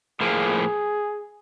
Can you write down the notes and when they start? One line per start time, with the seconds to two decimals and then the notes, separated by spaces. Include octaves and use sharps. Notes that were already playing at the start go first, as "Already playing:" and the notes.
0.21 A2 F3 A#3 G#4